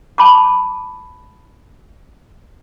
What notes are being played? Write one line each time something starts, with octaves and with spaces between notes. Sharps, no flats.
A5 B5 D6